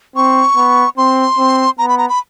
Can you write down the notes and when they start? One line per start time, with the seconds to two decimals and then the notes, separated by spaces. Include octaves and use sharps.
0.16 C4 C#6
0.56 B3
0.97 C4 C6
1.38 C4
1.78 B3 A#5
1.89 B5
1.98 A#5
2.09 B5